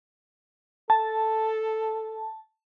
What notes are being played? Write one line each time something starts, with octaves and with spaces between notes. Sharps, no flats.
A4 A5